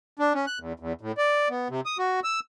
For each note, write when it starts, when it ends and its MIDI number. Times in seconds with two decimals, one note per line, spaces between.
0.19 0.33 62
0.34 0.46 61
0.47 0.59 90
0.59 0.73 40
0.80 0.93 40
1.01 1.12 45
1.18 1.48 74
1.49 1.68 59
1.70 1.81 48
1.86 1.97 87
1.98 2.20 66
2.24 2.40 88